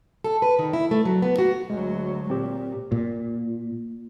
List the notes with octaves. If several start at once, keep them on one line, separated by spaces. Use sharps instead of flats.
A4
B4
D#3
E4
A3
F#3
B3
F#4
D2 F#3 G#3
A#2 C4 G4
A#2